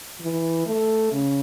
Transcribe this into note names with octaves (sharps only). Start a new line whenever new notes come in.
E3
A3
C#3